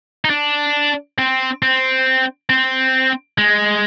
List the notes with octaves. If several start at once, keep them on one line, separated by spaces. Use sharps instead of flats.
D#4
D4
C4
C4
C4
G#3